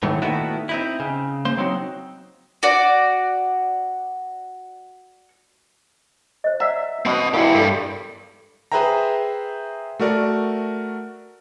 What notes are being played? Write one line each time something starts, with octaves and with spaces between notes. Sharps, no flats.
G#2 B2 D#3 E3 F#3 A3
A#2 D#3 A3 B3 E4 F#4
C4 D#4 E4
C#3
A#3 C5 C6
F#3 C4 D#4 F#4
F#4 D5
C5 D#5
D5 E5 F#5 A#5
B2 C4 D#5
E2 E4 G4 A#4 F5 B5
G2 G3 A4 A#4
G#4 B4 C5 E5 G5 A#5
A3 F#4 A#4 D5 F#5